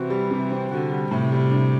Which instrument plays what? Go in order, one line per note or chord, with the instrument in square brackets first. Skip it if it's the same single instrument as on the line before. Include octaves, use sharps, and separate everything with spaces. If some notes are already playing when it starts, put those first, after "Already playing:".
Already playing: [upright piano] C3 C4 F#4 [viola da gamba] E3
[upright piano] G3
C3
C4
[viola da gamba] D3 [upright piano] F#4
[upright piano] G3
[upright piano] A2 [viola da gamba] C3
[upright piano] G3
D4